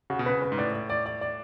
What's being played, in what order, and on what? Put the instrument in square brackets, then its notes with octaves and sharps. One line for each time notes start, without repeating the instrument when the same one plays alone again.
[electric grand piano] C#3 [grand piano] F#4
[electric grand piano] B2
[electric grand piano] C#3 [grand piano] B4
[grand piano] B4
[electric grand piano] G#2
[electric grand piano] A2 [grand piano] D5
[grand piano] D5
D5
D5
D5